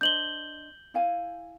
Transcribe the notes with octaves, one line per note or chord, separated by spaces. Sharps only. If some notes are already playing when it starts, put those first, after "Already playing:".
D4 C5 D#5 G6 F#7 G7
E4 F5 G#5